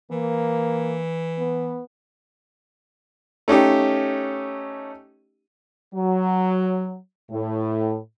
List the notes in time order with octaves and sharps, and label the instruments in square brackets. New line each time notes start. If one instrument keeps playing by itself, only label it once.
[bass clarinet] E3 [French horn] A#3
[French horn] B3
[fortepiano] A3 C#4 D#4 G4
[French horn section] F#3
A2